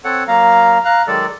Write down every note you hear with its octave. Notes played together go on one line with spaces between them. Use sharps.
C4 A4 C#5 F#5
F#3 A#3 F5 A#5
F5 A#5 F#6
D#3 F#3 G#3 A4 D5